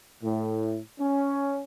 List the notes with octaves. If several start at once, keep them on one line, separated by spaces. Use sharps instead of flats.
A2
C#4